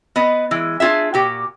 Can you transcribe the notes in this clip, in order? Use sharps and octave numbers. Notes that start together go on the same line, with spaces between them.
B3 B4 D#5
E3 G#3
D4 F4 G#4 E5
A#2 F#4 G4